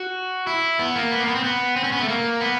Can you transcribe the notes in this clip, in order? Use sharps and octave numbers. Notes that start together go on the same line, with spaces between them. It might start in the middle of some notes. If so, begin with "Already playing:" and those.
Already playing: F#4
E4
B3
A#3
B3
A#3
B3
C4
B3
C4
C#4
B3
A3
A#3
B3